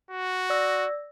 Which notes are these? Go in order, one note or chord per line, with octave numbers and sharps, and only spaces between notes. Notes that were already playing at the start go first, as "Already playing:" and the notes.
F#4
D5 E6 A#6